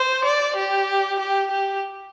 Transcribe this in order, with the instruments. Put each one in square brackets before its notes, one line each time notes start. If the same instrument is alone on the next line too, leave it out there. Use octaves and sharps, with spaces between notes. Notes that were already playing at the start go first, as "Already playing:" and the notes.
Already playing: [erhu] C5
D5
G4
G4
G4